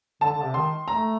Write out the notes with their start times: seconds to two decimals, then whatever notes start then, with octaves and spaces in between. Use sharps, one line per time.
0.21 D3 A5
0.32 D3
0.43 C3
0.54 D#3 C6
0.88 A3 A#5